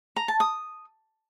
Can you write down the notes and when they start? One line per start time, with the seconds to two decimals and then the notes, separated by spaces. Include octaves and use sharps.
0.16 A#5
0.28 A5
0.40 D#6